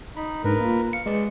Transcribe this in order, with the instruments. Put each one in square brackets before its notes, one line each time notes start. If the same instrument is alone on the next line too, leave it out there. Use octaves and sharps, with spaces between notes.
[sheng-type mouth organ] D#4 B5
[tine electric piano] G#2 D4 [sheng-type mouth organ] A#4 B4
[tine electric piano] A#3 F4
[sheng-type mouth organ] F5 [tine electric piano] C#7
[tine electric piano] G#3 B4 C#7 [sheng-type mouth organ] D5